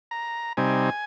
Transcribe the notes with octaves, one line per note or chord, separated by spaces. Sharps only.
A#5
C3 G3 C4 D#4 G#5